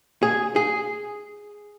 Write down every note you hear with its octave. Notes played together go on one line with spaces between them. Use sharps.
G#4
G#4